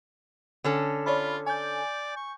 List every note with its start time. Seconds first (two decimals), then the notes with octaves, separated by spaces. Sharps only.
0.64 D3 C#4 A4
1.06 F4 C#5 D5 B5
1.47 D5 G#5 G6
2.17 C#6